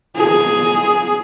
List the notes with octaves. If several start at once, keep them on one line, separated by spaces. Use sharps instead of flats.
G#4